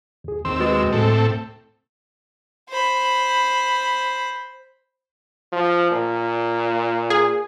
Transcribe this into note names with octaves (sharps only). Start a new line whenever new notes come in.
D#2 G#4
D#2 C4 C6 E6
G#3 F#4 B4 A6
D2 A2 C4 A4
C5 B5
F3
A#2
G#4